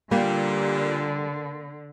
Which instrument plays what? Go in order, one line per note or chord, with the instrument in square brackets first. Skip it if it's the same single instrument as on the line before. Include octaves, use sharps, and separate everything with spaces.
[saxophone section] A#2 [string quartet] D3 [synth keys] G3 [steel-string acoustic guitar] A#3